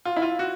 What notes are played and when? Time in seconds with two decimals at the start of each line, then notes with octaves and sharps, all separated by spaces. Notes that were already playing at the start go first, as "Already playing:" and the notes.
0.05 F4
0.16 E4
0.22 F4
0.39 F#4